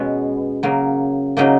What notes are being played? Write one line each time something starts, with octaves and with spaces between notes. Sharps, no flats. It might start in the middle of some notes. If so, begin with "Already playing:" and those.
Already playing: B2 G#3 B3 C#4
C#3 F#3 A#3
C#3 F#3 A#3 D#4